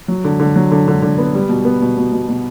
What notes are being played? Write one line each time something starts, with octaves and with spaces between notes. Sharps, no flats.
F#3
D3
D3
F#3
D3
D3
D3
B3
G3
B2
B3
B2
B2
B2
B2